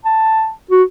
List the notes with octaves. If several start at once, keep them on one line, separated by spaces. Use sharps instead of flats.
A5
F#4